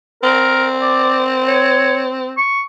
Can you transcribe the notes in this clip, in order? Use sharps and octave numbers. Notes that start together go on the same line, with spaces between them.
C4 A#4
D5
C#5
C#6